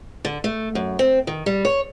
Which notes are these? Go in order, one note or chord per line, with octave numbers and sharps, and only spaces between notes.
D3
A3
F#2
C4
D#3
G3
C#5